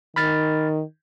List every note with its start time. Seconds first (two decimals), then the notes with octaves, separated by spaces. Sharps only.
0.16 D#3 B5 F6 A6